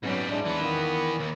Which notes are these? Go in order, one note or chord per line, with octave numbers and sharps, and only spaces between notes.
G#2 F#3 G3 B3 C#4 B6
G#3 D4 E4 D5
E3 B3
D#3 D#4 F5
D#2